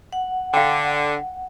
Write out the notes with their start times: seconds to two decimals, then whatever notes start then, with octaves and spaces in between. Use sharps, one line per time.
0.13 F#5
0.54 D3 F5 G5